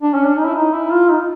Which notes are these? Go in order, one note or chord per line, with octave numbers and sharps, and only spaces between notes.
D4
C#4
D4
D#4
E4
D#4
E4
F4
D#4